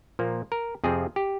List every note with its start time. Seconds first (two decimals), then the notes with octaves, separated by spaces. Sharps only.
0.19 A#2 F3 A#3
0.52 A#4
0.84 F2 C3 F3 C4 G#4
1.16 G4